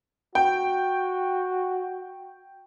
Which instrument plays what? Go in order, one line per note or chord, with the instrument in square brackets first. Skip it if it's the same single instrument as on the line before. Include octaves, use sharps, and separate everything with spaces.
[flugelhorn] F#4 [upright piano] G5